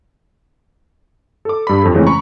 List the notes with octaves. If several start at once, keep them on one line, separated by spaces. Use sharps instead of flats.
A4 D6
G2 B5
F2 A4
C#3 E3 G#3 A3 C4 C#4
A#5 B5 C#6